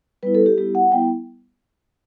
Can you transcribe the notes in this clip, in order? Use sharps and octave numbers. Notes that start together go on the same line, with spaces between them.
G3 B3 E4 B4
A4
G4
G3 B3 E4 G4
F#5
G3 B3 E4 G5